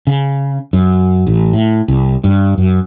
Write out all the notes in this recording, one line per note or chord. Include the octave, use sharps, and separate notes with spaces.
C#3
F#2
A1
A2
C2
G2
F#2